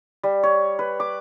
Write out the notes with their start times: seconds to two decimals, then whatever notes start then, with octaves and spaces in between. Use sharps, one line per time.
0.23 G3
0.43 C#5
0.79 B4
1.00 D6